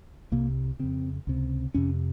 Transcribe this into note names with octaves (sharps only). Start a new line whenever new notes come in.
C2 C3 A#3
F2 C#3 C4
C#2 C3
F2 C3 C#4